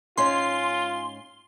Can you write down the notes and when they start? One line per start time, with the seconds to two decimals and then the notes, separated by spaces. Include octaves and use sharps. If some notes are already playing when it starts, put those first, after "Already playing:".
0.17 G#2 C#4 F4 C6